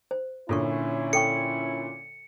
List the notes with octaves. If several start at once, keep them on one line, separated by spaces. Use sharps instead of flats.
C5
A#2 D3 C#4 E4 F4 A4 C#5 C#6
A4 G5 C#6 C#7